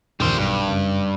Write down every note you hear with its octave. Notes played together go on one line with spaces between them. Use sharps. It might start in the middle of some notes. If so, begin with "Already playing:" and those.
A#1 D#2 G3 C5
B1 G2
F#1